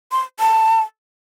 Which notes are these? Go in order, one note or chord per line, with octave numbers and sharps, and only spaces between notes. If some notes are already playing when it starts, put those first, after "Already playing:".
C6
A5